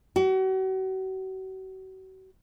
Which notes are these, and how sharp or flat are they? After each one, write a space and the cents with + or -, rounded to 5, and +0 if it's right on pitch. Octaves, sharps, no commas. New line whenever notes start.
F#4 +40